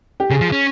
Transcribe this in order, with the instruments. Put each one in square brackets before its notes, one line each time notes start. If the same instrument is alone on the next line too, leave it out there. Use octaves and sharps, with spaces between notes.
[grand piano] G4
[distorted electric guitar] C#3 [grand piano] G#4
[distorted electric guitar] F3
C#4